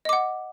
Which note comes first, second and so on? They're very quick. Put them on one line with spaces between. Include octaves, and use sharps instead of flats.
D#5 D6 F#5